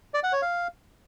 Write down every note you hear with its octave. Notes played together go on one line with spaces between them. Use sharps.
D5
F#5
C#5
F5